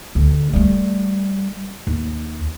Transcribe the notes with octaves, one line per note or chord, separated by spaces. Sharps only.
D2
G3 A3
D#2